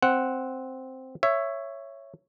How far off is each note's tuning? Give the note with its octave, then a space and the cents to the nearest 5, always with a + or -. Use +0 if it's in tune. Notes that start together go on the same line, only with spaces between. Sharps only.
C4 +0 F#5 +0
C#5 +0 E5 +15